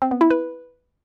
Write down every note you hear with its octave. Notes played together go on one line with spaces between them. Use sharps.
C4
B3
E4
B4